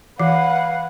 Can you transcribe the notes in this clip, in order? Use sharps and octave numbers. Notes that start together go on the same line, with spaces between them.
E3 B4 F5 F#5